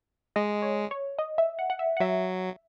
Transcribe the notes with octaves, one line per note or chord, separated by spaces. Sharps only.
G#3 D#5
C#5
C#5
D#5
E5
F#5
F#5
E5
F#5
F#3 E5